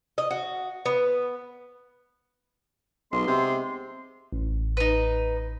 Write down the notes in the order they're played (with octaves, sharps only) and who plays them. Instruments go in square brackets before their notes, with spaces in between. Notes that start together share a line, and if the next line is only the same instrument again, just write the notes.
[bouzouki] D#5
F#4
B3
[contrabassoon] B1 [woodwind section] G#3 B3 C6
[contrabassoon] C3
[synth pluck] A1
[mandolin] D#4 B4